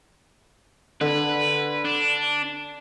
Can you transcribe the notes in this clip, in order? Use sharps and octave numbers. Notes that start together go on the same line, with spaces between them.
D3 B4
D4